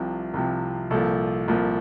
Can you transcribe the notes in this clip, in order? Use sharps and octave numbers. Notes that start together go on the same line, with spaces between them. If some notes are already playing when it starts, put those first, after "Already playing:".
Already playing: C2 C3 F3
C2 C3 F3
C2 A#2 F3 A4
C2 A#2 F3